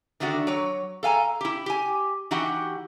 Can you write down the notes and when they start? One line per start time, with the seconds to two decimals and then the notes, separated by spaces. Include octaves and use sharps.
0.20 D3 D#3 A3 D4 F#4
0.47 F#3 C#5
1.03 A4 F5 G#5 A#5
1.41 E4 G4
1.66 G4 G#5
2.31 E3 D#4 F#4 G4 F#5